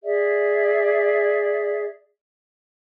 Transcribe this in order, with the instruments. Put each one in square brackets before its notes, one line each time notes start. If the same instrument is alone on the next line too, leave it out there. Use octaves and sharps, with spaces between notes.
[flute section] G#4 D5 E5